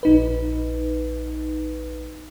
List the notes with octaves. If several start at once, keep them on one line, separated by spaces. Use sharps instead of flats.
A#1 D#4 B4